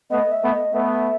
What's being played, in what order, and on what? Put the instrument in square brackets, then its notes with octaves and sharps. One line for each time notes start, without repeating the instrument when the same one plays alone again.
[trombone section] A3 B3 [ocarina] D#5
[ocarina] E5
[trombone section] A3 B3
[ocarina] D#5
[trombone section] A3 B3 [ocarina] E5